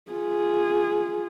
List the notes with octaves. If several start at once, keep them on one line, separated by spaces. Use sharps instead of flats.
F4 G#4